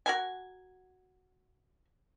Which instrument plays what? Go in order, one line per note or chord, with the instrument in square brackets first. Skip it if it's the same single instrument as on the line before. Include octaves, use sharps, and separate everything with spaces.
[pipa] F#4 A#4 G#5